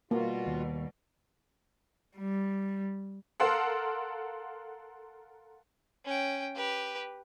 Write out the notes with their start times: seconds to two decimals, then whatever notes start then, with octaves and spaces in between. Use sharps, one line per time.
0.11 B2 G3 A#3 F4 F#4
0.46 D#2
2.17 G3
3.40 A4 A#4 F5 F#5 A5 C6
6.05 C#4 G5
6.56 G4 B4